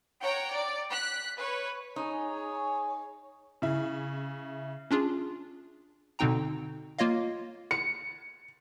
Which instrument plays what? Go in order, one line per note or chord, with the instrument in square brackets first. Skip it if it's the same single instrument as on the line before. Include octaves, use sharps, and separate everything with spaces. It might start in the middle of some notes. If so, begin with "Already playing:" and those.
[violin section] C#5 F#5 G5 A#5
D5
F#6 B6
B4 C#5
[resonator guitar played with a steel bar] D#4 [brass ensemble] G#4 G#5 [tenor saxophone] C#5
[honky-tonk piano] C#3 E4
[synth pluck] C#4 D4 F4 G#4
B2 D3 C4 D#4 G5 A#5
A#3 F4 C#5 D#5 F5
[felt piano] C#7